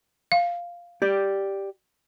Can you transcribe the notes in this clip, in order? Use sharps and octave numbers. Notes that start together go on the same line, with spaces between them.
F5
G4 D5